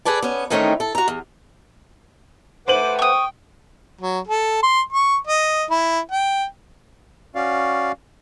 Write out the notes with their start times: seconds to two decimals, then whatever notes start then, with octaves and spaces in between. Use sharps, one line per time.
0.05 G#4 A4 B4 D5 A5
0.22 B3 C#4
0.50 D#3 E3 A3 C4 C#4 D#4
0.80 A4
0.95 F#4 A#5
1.08 E2
2.68 A3 B4 C5 F#5 D6 D#7 F#7
2.99 G5 C#6 D#6
4.01 F#3
4.27 A4
4.63 C6
4.92 C#6
5.27 D#5
5.70 E4
6.11 G5
7.35 C#4 F#4 D5 F5